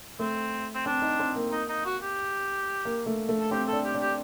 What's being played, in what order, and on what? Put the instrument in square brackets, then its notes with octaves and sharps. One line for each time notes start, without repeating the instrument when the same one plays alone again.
[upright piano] A3 [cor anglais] C4
[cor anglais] C4
[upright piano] C4 [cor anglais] D4
[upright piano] D#4
C4
A#3
[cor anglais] D#4
D#4
F#4
G4
[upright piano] A#3
A3
A3
[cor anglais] A4
[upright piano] C4 [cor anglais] G4
[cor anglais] A4
[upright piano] D4
[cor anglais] G4
[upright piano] D4
[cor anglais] G4